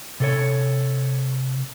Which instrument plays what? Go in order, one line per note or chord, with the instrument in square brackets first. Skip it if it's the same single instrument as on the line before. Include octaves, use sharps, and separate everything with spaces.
[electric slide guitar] C3 A4 C#5